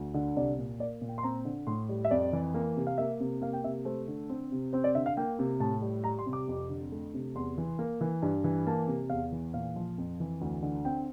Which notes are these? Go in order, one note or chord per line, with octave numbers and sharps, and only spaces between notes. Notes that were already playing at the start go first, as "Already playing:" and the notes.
Already playing: D2
D3
C2 D5
A#2
A#3 D5
A#2
G5
C6
C4 A#5
D3
A2 C6
G3
E5
F2 D5
E3
A#3
C3
F5
A#3 E5
C3
A#3 F5
G5
C3 E5
A3 C5
D3
C4 C5
C3
C4 C5
D5
D3 E5
F5
A#3 G5
C3
A2 A5
G3
G3 A#5
C6
C3
D6
F2
D3
A3
C3
E2 C6
E3
A#3
E3
G2
E3
A#3 A5
C3
E2 F5
E3
A#2 F5
F3
F2
E3
D2
D3
C4 G5